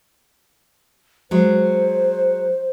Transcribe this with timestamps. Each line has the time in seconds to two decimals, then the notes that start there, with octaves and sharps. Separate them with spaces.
1.31 F#3 G#3 C5